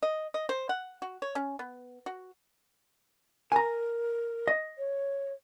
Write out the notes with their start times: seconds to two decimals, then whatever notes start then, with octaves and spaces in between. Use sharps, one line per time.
0.03 D#5
0.34 D#5
0.49 C5
0.69 F#5
1.02 F#4
1.22 C#5
1.35 C#4
1.59 B3
2.06 F#4
3.52 A#4 G#5 A#5
4.48 D#5
4.78 C#5